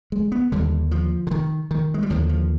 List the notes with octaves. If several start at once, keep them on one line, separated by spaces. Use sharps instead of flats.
G#3
B3
D#2 D3 G3
F3
D3
D#3
D#3
G#3
G3
D#2 D3 F3
F3